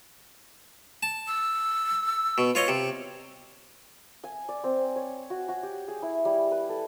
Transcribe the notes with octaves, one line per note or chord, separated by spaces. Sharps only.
A5
E6
B2
F4 C#5 D#5
C3
G#5
D5
C4
C#5
F#4
F#4
G4
G#4
E4
G3
B4
A4